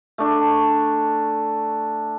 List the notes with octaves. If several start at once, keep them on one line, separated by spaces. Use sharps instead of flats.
A3 D4